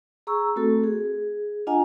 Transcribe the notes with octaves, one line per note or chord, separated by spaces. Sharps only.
G#4 A#5 C#6 E6
A3 C4 F#4 A4
G#4
D4 F4 D#5 F#5 G#5 A#5